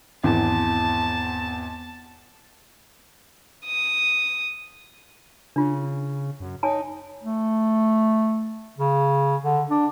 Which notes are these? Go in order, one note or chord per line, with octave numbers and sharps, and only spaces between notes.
G#1 E2 E3 A5
D#6
C#3 D4 F4
F#2
D#4 C#5 G#5 A5
A3
C#3
D3
D4